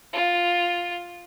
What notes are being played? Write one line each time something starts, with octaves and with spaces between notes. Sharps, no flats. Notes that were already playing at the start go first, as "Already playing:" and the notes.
F4